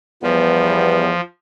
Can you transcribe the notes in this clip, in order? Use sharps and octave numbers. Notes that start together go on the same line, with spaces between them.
E2 F3 G3 B3